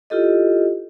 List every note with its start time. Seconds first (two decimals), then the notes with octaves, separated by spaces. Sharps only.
0.10 E4 F4 G4 A4 D#5